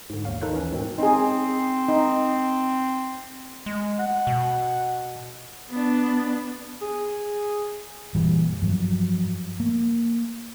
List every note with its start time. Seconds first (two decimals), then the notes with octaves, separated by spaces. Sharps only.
0.10 G#2 D3
0.25 A#1 D#2 C#5 F5
0.41 D#3 D#4 A4 B5 F#6
0.53 E3 C#4
0.72 G#2 B2 D#3 C4
0.98 C4 D#4 G#4
1.88 D#4
3.66 G#3
3.99 F#5
4.27 B2
5.70 B3 D4
6.82 G#4
8.15 F#1 A#2 E3 G3
8.62 G2 F3 F#3
9.60 A#3